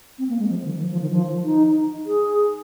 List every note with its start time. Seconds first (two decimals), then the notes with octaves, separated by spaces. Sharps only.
0.18 C4
0.29 A#3
0.39 G#3
0.50 F3
0.65 D#3
0.80 F3
0.92 F3
1.02 D#3
1.12 F3
1.44 D#4
2.06 G#4